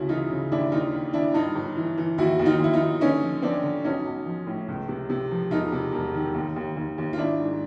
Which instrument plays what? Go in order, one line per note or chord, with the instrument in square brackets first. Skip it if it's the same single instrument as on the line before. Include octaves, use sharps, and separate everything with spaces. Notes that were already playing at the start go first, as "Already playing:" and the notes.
Already playing: [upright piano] D2 C#3 E4 F#4
E3 D#4 F4
C#3
D#2 D4 E4
D#2 D#4 F4
D#3
D#3 D4 E4
G2 D#4 F4
G1
E3
E3
D#2 E4 F#4
D#2
D#4 F4
D#2 E4
D#4 F4
D#2
D3 C#4 D#4
F3
F3 C4 D4
D3
B1 C#4 D#4
B1
F3
A2
C#2
C3
C3
F3
E1 D#4 F4
C3
E1
D#3
D#2
D#2
D#2
D#2
F4
G#1 D4 E4
G#2